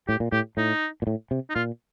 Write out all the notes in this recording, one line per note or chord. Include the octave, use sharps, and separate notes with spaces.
A2 G4
A#2
A2 G4
A2 D#4
A#2
A2
C3
D#4
A#2 F4